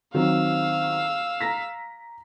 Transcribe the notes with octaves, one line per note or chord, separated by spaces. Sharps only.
D#3 F#3 C4 F5 E6
A#5 A#6 B6